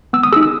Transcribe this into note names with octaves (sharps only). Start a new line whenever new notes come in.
B3 E6
D#6
D#4 G#4 E6
E6